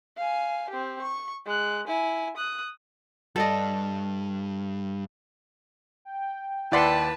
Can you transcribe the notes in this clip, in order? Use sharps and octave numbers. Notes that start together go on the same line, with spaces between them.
F5 G#5
C4 G4
C#6
G#3 F#6
E4 G#5
D#6 F#6
G2 A4 D5 D#5
G5
D#2 E4 B4 D5 F#5 A5 C6 B6